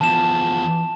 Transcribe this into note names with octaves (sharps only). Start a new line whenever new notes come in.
E2 F3 A5 E7